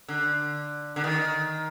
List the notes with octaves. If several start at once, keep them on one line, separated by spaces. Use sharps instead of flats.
D3
D3
D#3